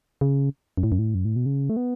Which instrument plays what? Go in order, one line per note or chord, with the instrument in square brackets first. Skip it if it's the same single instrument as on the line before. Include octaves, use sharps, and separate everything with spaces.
[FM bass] C#3
F#2
A2
F#2
A2
F#2
A2
B2
C#3
A3
B3